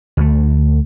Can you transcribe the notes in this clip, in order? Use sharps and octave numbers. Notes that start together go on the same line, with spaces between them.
D2 A3